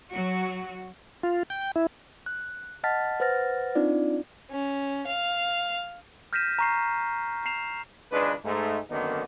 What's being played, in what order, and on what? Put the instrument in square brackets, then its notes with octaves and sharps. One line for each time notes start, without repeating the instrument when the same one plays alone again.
[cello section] F#3 F#4
[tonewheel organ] F4
G5
E4
[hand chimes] F#6
D#5 F#5 A5 F6 A6 B6
B4 C5 F#5 F6 A6 A#6
C4 D4 D#4 F4 D5
[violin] C#4
F5
[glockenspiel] F6 G6 A#6 B6 D#7 E7
A#5 C#6 C7
A#5 C7 E7 F7
[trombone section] G#1 C#2 G#3 D4 B4
G#2 A3
F#2 D3 D#3 A#3 B3 D#4